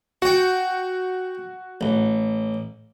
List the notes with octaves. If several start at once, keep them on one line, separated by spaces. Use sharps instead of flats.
F#4 F#5 G5
A1